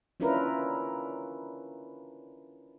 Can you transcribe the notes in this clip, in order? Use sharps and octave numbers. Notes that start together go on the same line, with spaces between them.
C#4 D4 E4 F4 A#4 B4